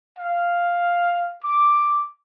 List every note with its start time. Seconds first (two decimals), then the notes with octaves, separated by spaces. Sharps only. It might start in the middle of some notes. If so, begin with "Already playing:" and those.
0.18 F5
1.43 D6